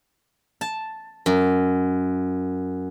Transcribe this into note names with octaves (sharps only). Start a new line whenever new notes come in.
A5
F#2